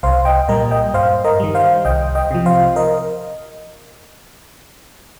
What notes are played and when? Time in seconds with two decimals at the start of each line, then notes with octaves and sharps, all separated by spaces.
0.03 C2 C5 F5
0.25 D#5 G5
0.48 A#2 G3 A#4 D#5
0.71 D#5 G5
0.94 G2 C5 F5
1.24 A#4 D#5
1.40 D#3 G3
1.55 C5 F5
1.85 C2 D#5 G5
2.15 D#5 G5
2.31 C3 F3
2.46 C5 F5
2.76 A#4 D#5